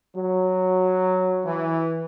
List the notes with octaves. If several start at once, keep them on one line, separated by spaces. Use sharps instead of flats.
F#3
E3